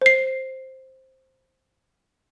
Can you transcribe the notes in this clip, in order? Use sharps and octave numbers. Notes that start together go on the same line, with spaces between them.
C5 C7